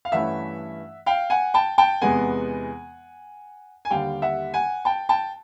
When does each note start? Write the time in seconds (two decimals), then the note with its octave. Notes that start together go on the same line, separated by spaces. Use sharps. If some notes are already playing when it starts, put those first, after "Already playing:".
0.05 F5
0.12 G2 E3 A3 C#4 E4 E5 F#5
1.06 F5 G5
1.30 F#5 G#5
1.54 G5 A5
1.78 G5 A5
2.02 E2 C3 E3 G#3 B3 F#5 G#5
3.85 G#5
3.90 D#2 D3 G3 F5 G5
4.22 E5 F#5
4.54 F#5 G#5
4.85 G5 A5
5.09 G5 A5